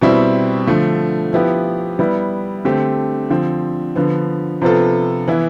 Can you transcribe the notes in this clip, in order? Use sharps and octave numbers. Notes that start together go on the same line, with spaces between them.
B2 G3 C4 E4
D3 F3 A3
F3 B3 E4 G4
G3 B3 E4
D3 A3 C4 G4
D3 F3 C4
D3 F3 B3
C3 F3 B3 F4 A4
E3 B3 E4